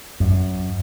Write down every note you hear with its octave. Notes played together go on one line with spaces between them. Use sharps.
F#2